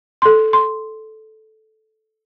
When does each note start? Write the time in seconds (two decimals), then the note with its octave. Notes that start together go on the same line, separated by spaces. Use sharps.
0.22 A4 C6
0.53 C6